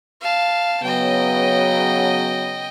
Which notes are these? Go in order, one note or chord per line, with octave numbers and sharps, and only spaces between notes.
F5 A5
C#3 F#3 B3 D#5 G5